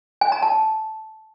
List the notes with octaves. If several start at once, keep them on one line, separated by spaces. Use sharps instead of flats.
G#5
A#5
A5